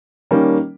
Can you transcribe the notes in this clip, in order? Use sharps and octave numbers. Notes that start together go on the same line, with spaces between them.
D#3 G3 A#3 C#4